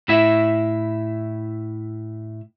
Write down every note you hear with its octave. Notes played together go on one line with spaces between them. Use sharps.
A2 E4 E5